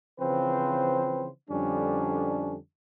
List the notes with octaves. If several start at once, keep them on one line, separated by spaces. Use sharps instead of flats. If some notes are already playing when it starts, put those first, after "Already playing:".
C#3 E3 F3 C4 B4 C5
F2 D3 G3 C#4 D4